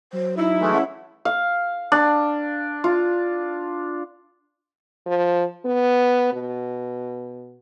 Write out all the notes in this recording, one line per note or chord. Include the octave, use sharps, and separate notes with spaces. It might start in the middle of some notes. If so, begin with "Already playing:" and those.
F#3 C5
D#4 E4
E3 G#3 A3
C#4 F#5
F5
D4
F4
F3
B3
B2